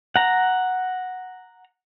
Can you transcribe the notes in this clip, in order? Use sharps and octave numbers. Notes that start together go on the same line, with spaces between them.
F#5 A#5